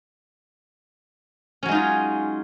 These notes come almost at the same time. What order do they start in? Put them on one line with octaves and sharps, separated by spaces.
C#4 F#3 G#3 D#4 F4